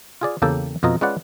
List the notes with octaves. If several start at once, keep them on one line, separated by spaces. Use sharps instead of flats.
F4 G#4 D5
E2 C#3 A#3 G4 A4 G5
F2 B2 F4 D#5 A#5
G#3 C#4 F4 B4 D5 F#5